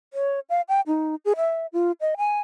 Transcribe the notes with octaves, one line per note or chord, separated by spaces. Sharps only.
C#5
F5
G5
D#4
G#4
E5
F4
D#5
G#5